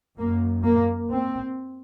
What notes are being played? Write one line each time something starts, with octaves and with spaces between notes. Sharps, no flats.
F#2 A#3
A#3
C4